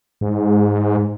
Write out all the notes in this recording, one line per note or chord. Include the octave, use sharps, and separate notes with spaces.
G#2